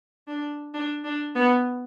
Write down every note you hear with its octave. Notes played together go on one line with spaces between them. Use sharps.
D4
D4
D4
B3